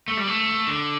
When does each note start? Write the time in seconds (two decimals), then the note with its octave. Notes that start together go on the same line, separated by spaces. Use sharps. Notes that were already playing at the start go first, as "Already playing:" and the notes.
0.08 A3
0.17 G3
0.28 A3
0.68 D3